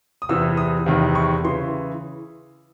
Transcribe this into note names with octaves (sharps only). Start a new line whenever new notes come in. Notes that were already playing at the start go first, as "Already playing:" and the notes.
D#6
E2 C3 E3 E6
D#6
E2 C3 D#3
C#6
C#3 E3 C6